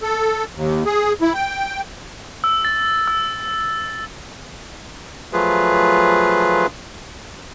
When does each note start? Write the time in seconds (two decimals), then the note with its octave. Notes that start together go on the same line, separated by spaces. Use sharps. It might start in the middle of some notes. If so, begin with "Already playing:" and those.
0.02 A4
0.55 D#2
0.86 G#4
1.22 E4
1.34 G5
2.44 E6
2.65 A6
3.08 E6
5.33 F3 F#3 A3 F4 G#4 B4